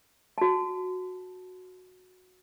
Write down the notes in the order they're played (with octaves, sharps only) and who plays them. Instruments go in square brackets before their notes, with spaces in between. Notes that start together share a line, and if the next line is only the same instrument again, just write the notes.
[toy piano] F#4 A5